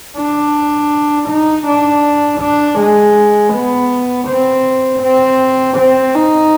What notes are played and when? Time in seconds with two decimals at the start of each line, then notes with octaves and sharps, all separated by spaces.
0.18 D4
1.29 D#4
1.67 D4
2.41 D4
2.79 G#3
3.53 B3
4.28 C4
5.02 C4
5.78 C4
6.15 D#4